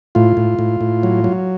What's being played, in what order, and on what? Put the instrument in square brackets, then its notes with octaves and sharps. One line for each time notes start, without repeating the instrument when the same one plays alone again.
[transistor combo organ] A2 F4
A2
A2
A2
F#3
F#3